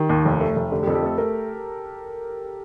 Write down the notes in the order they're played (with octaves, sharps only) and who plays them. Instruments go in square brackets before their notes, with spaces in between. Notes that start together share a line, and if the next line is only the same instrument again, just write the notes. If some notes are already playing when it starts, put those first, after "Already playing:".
Already playing: [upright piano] D#3 [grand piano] G4
[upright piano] D#2
F1
A3
F1
[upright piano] D3 [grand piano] G4
[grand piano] G4
[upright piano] F2 [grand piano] A4
[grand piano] G4
[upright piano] A3 [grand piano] A4
[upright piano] A3 [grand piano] A#4